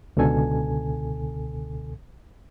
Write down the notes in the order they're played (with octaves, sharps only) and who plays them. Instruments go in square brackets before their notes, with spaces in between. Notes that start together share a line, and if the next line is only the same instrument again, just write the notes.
[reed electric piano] C#2 B2 D3 A4 G#5